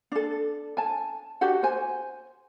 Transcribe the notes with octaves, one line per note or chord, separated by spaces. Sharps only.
D4 A4
G#5 A5
D4 F#4 G4 F#5
C5 G#5